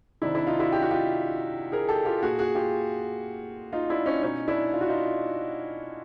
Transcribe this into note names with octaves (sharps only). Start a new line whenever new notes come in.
C3 D#3 D4 E4
D4 E4
D#4 F4
E4 F#4
G4
F#4
F4 G4
G#4 A#4
G4 A4
F4 G4
A#2 F#4 G#4
F#4 G#4
F4 G4
D#4 F4
D4 E4
C#4 D#4
B2 C#4 D#4
D4 E4
F4
F#4
D#4 F4